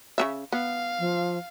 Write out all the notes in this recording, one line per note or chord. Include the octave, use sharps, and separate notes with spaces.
C#3 B3 E5
B3 F5
F3